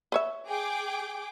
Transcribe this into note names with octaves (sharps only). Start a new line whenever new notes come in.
B4 C#5 E5
G#4 G5 D6